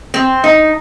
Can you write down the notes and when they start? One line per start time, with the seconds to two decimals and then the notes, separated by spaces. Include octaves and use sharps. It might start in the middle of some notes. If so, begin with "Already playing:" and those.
0.14 C4
0.44 D#4